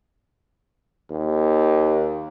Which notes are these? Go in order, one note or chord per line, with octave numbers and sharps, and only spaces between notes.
D#2